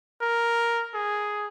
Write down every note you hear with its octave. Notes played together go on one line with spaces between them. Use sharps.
A#4
G#4